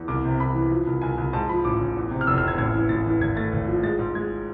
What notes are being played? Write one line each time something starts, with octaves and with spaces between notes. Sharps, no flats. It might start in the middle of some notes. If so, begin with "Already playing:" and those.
Already playing: E2
C2 D6
C3
C2 B5
E3
F3
C2
C2 G#5
C2
G#2 A5
F3 B5
A1 D6
A1
E2
C3
F6
F1 E6
F6
C3 G#6
A1 G#6
E3
A1 A6
E3
G#1 G#6
A3 A6
G#1
F3
G#3 A6
G#2
G#3 G#6